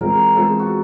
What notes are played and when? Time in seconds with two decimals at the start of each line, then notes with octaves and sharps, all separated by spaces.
0.01 E3 G#3 C4 F4 A#4
0.36 E3 G#3 C4 F4 A4
0.59 F#4